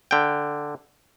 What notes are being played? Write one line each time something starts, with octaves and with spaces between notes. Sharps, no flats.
D3 G5